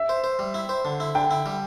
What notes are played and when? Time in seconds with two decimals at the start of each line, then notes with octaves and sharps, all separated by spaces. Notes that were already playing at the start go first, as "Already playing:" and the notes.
Already playing: E5
0.09 C5
0.24 C5
0.39 G3
0.54 E4
0.69 C5
0.85 D3
1.00 E4
1.15 D3 G5
1.31 E4
1.46 G3